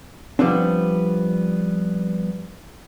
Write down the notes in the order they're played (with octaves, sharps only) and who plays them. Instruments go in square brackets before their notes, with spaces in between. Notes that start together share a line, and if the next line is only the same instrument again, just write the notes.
[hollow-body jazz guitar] F3 G3 B3 C4 D4